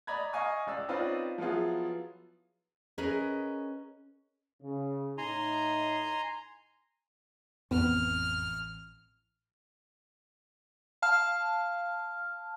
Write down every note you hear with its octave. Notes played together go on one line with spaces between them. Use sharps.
D5 D#5 A#5 B5 G#6
D#5 F5 G#5 C#6
C#2 D5 E6
C4 C#4 D#4 F4 B4 D5
F3 F#3 B3 E4 F4 G#4
C#4 G#4 A#4 B4 D#5
C#3
A2 D#4 G#5 A#5 C6
A1 F2 B3 C4 F6
F5 A5 F6